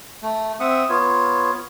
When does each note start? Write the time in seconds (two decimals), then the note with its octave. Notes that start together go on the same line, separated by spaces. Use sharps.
0.22 A3
0.60 C4 E5 F#5 D#6
0.89 B3 F4 C#5